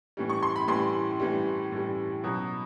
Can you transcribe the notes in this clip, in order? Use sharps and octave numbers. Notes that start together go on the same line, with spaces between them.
A2 E3 G3
C#6
C6
B5
A2 E3 G3 C6
A2 E3 G3
A2 E3 G3
B2 F#3